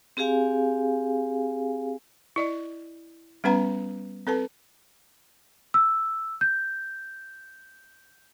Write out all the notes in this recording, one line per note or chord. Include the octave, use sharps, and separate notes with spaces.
C4 G4 G#4 F5 G#5
E4 D5 D#5
G3 B3 C#4 B4 F#5 A#5
C4 A4 B4 A5
E6
G6